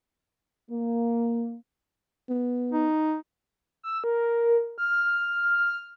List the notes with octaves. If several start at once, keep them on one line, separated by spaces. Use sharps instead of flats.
A#3
B3
D#4
E6
A#4
F6